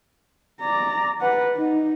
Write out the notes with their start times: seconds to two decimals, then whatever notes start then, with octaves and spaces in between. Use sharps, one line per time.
0.61 D5 A#5
1.21 B4 F#5
1.55 D#4